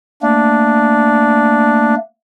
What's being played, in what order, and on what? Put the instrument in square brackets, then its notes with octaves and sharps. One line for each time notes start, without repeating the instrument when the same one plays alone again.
[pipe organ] A3 A#3 [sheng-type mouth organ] D4